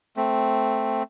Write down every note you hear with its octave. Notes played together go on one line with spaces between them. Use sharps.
A3 C4